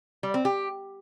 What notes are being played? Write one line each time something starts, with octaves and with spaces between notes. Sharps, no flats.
G3
C4
G4